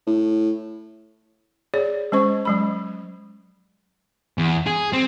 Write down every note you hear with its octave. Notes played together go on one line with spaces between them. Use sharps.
A2
G#4 C#5 D5
G#3 C#4 C5 C#6
F#3 G#3 B5
G#3
E2
G#4
C4